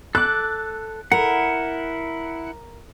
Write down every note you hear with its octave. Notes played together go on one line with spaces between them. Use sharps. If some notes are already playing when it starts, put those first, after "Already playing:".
A4 D6 F#6
E4 A#4 F#5